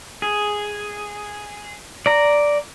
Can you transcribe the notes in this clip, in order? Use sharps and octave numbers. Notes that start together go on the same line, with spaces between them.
G#4
D5 A#5